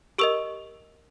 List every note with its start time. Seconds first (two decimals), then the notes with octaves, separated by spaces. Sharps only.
0.18 G4 A#4 D#5 C#6 E6